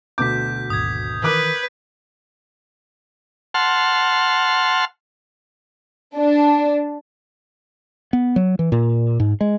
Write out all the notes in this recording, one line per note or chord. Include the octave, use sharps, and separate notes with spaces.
D2 B2 D6 G6 B6
G#1 D#2 D#6 G#6
D#3 E3 A#4 B4 D6 F#6
F#5 A5 C6 F6
D4
B3
F#3
E3
A#2
G#2
G#3